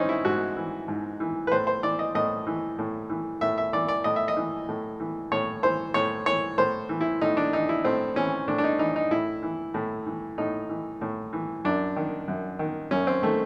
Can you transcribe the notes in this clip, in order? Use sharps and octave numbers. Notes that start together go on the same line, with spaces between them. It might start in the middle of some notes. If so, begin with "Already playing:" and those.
Already playing: G#2 E3 C4 C#4 D#4
E4
G#2 F#4
E3
G#2
E3
B4
A2 C5
C5
E3 D5
D#5
A2 D#5
E3
A2
E3
A2 E5
E5
E3 D5
D5
A2 D#5
E5
D#5
E3
A2
E3
A2 C#5
E3 C5
A2 C#5
E3 C#5
A2 C5
E3
E4
A2 D#4
D4
E3 D#4
E4
A2 C4
E3 C#4
A2 D4
D4
D#4
E3 D#4
D#4
A2 E4
E3
A2
E3
A2 D#4
E3
A2
E3
F#2 D4
D#3
F#2
D#3
F#2 C#4
C4
D#3 A3